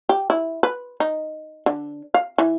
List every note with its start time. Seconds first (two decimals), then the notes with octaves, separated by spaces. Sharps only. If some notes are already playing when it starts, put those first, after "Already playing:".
0.09 G4
0.30 E4
0.63 B4
1.00 D#4
1.66 D3
2.14 F5
2.38 E3